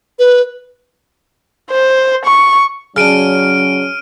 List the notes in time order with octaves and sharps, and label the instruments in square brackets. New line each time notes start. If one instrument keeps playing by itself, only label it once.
[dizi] B4
[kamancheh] C5
C#6
[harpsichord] C#3 D4 [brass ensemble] F#3 C#4 [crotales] F6 D7 D#7